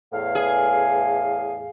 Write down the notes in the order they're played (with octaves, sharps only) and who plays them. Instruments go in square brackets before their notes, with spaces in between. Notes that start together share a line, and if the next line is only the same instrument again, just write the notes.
[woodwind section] E2 A2 F5
[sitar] G#4